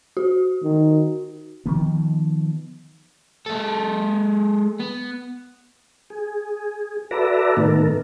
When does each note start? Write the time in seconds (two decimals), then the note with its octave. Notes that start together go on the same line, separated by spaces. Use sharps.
0.17 F#4
0.63 D#3
1.66 D#3 F3 B3
3.46 G#3 A4
4.80 B3
6.10 G#4
7.11 F#4 A4 B4 D5 E5 A#5
7.57 A2 D#3 B3 A4 A#4